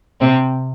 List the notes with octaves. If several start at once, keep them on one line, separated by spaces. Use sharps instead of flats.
C3 C4